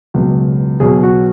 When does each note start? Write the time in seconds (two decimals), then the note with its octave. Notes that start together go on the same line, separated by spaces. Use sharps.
0.14 C#2 B2 F#3
0.80 B1 B2 F#3 G#4
1.03 F#4